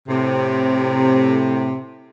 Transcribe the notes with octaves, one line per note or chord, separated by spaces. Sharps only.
A2 C3